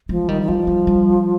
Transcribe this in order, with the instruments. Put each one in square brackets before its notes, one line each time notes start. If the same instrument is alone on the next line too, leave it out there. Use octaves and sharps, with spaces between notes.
[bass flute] F3 [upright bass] G#3
[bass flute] D#3 [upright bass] G3
[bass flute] D#3
[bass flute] F3 [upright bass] G3
[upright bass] G3
G3